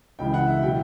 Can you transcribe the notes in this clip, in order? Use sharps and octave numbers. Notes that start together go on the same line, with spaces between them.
C#2 C#3 E3 G5
F#5
E5
B2 F#3 G5